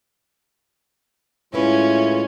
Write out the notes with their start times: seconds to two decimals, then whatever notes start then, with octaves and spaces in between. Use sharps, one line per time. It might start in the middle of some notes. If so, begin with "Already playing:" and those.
1.54 A2 G#3 C#4 E4 F4 B4